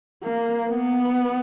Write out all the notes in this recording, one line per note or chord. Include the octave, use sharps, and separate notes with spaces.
A#3
B3